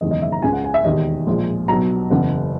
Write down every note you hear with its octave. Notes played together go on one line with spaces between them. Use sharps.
F#1 E2 D#3 G#3 D#5
D#5
E5
A#5
C#2 C#3 G#3 G#5
F#5
G#5
E5
E1 D#2 D#3 D#5
A#1 A#2 G#3
B1 B2 F#3 A#5
F#1 E2 C#3 F#5